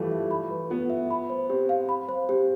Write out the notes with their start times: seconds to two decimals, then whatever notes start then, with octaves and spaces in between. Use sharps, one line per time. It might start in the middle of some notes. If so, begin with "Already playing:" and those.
Already playing: E3 F3 G3 A3 F4
0.11 E5
0.31 B5
0.51 B4
0.70 B3 F4
0.90 E5
1.11 B5
1.30 C5
1.50 C4 G4
1.69 F5
1.89 B5
2.09 C5
2.29 C4 G4